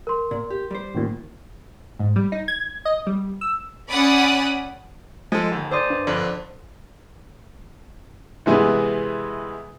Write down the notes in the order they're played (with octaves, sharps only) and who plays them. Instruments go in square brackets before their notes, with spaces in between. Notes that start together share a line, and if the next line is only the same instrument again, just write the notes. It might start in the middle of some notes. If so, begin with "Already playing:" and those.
[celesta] A#4 C6
[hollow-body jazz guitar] A#2
G4
G3 C5
[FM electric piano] A1 D#2 A#2
[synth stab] G#2
G3
D#4
G#6
D#5
G3
E6
[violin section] C#4 D5 F#5 B5 D#6
[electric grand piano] F3 A4 [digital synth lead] G#3 [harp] G#4
[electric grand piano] D#2 [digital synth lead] D3
[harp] C5 D5 D#5
[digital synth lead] G2
[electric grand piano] F2 D3 D4
[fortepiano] C3 E3 G#3 B3